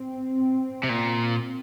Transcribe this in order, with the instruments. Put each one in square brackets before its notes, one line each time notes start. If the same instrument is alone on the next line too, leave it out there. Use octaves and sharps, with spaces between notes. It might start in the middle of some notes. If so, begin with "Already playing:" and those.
Already playing: [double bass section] C4
[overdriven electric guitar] C3
A#2